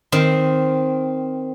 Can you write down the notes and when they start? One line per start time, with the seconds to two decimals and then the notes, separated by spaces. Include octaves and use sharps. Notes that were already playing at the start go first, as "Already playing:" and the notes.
0.12 D#3 C4